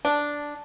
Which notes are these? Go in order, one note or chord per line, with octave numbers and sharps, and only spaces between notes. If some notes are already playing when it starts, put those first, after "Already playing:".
D4